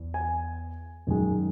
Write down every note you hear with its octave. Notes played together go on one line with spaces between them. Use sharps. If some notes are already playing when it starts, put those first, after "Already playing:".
Already playing: E2
G#5
F#2 D#3 G#3